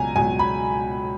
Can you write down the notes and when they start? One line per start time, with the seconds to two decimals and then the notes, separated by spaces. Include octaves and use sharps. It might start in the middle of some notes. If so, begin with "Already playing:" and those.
Already playing: C#2 B2 F#3 G#5 A#5
0.16 C#2 B2 F#3 G#5
0.39 B5